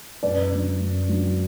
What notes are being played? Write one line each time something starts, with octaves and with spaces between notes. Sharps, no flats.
F#2 B4 D5
D3 F#3
F#2
D3 F#3